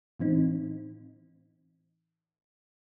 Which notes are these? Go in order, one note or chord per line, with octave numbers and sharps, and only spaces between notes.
A2 E3 C4 D#4